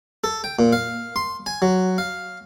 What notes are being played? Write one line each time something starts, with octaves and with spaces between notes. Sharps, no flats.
A4
G5
A#2
F5
C6
G#5
F#3
F5